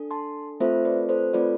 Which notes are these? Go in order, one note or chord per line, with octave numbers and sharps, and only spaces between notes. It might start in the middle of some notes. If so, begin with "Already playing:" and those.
Already playing: D4 A4
A5 C6
A3 C4 F4 A4 C5 E5
B4 D5
A4 C5
A3 C4 F4 A4 B4 D5